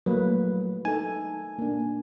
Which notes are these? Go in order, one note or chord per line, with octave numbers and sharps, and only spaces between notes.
F#3 A3 A#3 B4
D#4 A4 G#5
A#3 D4